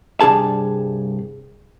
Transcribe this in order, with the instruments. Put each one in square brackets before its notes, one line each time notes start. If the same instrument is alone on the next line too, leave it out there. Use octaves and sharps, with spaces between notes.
[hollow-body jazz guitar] C2 G2 D#3 D4 G#4 A5